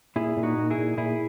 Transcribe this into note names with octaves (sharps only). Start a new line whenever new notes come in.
A#2 E4 G#4
A#2
D#4 F#4
A#2
E4 G#4
A#2
A#2 E4 G#4